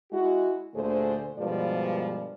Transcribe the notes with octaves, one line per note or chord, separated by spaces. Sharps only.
G#3 E4 F#4
D2 A#2 D3 A3 G#4 C5
G2 B2 F3 G#3 A#4 D5